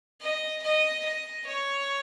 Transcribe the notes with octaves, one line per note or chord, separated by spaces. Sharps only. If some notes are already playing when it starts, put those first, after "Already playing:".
D#5
D#5
D#5
C#5